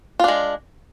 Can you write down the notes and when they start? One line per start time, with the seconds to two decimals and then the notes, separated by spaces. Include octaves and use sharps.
0.20 F4
0.24 D4
0.28 G#3